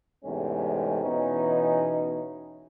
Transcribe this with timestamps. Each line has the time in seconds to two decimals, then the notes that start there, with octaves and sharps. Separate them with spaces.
0.24 E2 G#2 C3 G#3 A3 C#4
1.02 E2 B2 E3 C#4 D#4